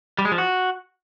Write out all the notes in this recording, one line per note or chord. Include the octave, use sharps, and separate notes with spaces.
G3
G#3
F3
F#4